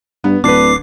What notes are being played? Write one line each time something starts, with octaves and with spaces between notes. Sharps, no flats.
G2 B3
D1 D3 D4 B4 D6 C7